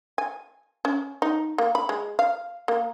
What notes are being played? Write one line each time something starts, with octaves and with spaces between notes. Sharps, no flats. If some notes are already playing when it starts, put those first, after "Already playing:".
G#5
C#4
D#4
A#3
B5
G#3
F5
A#3